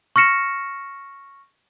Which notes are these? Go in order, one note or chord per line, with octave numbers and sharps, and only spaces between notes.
C#6 F6 A#6 C#7 E7